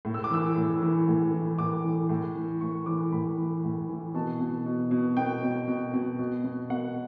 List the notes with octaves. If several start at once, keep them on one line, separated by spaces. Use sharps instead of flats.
A2
E6
D6
E3 E6
A2
E3
A2
E3
A2 D6
E3
A2
E3
A2 C#6
E3 D6
A2 B5
E3
A2
E3
B2 A5
B2
B2
B2
B2 G5
B2
B2
B2
B2
B2
B2 F#5